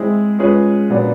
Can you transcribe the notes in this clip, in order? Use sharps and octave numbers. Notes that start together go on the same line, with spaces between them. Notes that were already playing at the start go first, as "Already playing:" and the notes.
Already playing: G#3 C4 E4 G#4
G#3 C#4 F4 G#4 B4
A#2 F#3 B3 D4